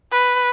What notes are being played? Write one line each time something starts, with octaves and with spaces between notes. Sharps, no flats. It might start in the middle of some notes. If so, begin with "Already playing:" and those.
B4